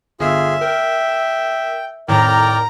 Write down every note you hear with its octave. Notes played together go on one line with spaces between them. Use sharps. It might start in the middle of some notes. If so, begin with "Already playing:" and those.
G1 F4 G#4 E5
A#4 G5
F2 A2 D#3 A#4 D5 G5 A#5